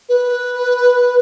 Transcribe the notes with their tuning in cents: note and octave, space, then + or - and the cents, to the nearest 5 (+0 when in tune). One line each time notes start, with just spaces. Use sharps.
B4 -5